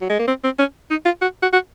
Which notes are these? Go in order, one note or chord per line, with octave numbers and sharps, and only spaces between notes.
F#3
G#3
A#3
C4
C4
C#4
D#4
F4
F#4
F#4
F#4